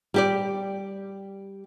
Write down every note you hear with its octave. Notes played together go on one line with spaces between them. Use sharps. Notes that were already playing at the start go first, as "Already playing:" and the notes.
G3 G4 D5